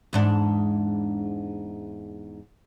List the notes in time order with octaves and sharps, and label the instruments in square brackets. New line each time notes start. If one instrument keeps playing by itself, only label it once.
[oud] E2 G#2 D4